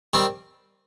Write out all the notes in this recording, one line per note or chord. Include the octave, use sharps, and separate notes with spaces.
D#3 G3 C4